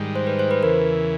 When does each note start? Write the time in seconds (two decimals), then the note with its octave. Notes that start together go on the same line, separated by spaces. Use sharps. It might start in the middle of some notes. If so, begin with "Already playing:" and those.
Already playing: G#2 D#3 G3
0.16 C5
0.27 B4
0.39 C5
0.51 B4
0.63 E2 C#3 E3 A#4